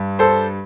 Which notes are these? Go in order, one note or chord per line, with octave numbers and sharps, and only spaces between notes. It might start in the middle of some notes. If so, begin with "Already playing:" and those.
Already playing: G2
A4 C5